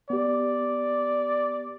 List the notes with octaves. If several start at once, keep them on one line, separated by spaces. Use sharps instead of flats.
B3 G4 D5